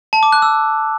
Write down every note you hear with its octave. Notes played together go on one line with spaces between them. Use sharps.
A5
D6
F#6
E6